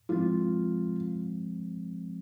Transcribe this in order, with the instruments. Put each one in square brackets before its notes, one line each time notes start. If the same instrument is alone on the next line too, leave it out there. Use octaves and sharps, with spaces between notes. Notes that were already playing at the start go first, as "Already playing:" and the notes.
[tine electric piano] F3 G#3 C4 [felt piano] F4